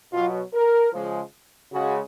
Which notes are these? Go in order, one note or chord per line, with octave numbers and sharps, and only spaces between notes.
B2 F#3 F4
A#4
C#3 F3 G#3
C#3 G#3 F#4